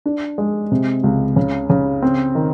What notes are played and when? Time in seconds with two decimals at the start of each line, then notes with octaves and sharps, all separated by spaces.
0.06 D4
0.38 G#3
0.72 C3
1.04 C#2
1.36 C#3
1.70 C#3
2.02 C4
2.35 D#3